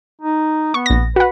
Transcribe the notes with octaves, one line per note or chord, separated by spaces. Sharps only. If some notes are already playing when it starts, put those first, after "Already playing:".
D#4
B3 C#6
A#1 A#6
F#4 B4 F#5